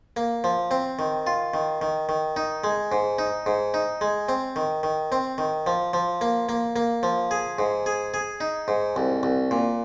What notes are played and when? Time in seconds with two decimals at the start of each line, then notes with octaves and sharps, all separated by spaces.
0.17 A#3
0.44 F3
0.71 C4
0.99 D#3
1.27 F4
1.54 D#3
1.82 D#3
2.09 D#3
2.36 D#4
2.64 G#3
2.92 G#2
3.19 D#4
3.46 G#2
3.74 D#4
4.01 G#3
4.29 C4
4.56 D#3
4.83 D#3
5.12 C4
5.38 D#3
5.67 F3
5.94 F3
6.21 A#3
6.49 A#3
6.76 A#3
7.03 F3
7.31 G#4
7.59 G#2
7.86 G#4
8.14 G#4
8.41 D#4
8.68 G#2
8.96 C2
9.23 C2
9.51 A#2